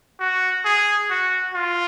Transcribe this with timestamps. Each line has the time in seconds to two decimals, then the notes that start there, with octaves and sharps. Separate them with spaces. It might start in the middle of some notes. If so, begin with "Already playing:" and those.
0.20 F#4
0.65 G#4
1.10 F#4
1.54 F4